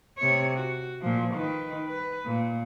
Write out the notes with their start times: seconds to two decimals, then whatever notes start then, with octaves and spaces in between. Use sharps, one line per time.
0.18 C3 C#5
0.56 F#4
1.01 A#2 F3
1.34 D#3 B4
1.88 B4
2.25 A#2